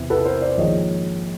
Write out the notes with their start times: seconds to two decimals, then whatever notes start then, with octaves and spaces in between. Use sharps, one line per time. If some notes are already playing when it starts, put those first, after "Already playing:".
Already playing: E2 C3 E3 C4
0.10 A4 B4
0.25 A#4 C5
0.41 C5 D5
0.57 A#1 G#2 D#3 G#3 C#5 D#5